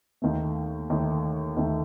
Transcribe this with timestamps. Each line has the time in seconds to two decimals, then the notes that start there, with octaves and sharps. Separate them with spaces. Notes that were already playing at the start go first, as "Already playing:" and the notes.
0.22 D#2 D#3 A3
0.90 D#2 D#3 A3
1.57 D#2 D#3 A3